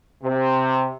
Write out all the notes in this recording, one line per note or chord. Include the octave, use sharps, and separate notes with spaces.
C3